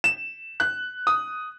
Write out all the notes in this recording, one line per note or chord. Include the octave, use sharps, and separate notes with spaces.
E7
F#6
D#6